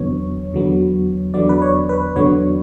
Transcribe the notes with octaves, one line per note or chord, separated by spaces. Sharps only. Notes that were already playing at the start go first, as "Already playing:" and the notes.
Already playing: E2 D3 F#3 B3 C#5
E2 D3 F#3 B3
E2 D3 F#3 B3 D5
B4
C#5
B4
E2 D3 F#3 B3 C#5